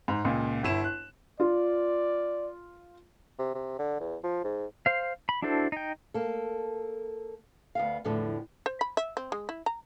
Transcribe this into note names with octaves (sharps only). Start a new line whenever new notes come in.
G#2
C#2 A#2
G1 E4 E7
F#6
F4 D5
C3
C3
D3
E2
F3
G#2
C5 F5
B5
D4 E4 F#4 A4 C5
D#4 G5
A#3 A4
D2 B3 F5
E2 A2 D3 F3
C5
B5
E5
C4
G#3
E4
A#5